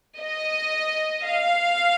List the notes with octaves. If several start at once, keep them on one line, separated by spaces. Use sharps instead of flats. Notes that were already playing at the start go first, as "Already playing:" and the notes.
D#5
F5